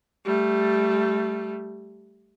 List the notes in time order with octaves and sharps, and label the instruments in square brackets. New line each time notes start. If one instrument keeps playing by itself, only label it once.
[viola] G3 A3